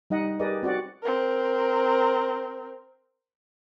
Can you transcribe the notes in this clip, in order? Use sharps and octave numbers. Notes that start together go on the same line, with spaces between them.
G3 D#4 D#5 F#5
G4 G#4 A#4 B4 D5 D#5
C4 F#4 D5 F#5
C4 A#4